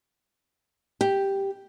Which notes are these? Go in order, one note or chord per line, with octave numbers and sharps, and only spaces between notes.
G4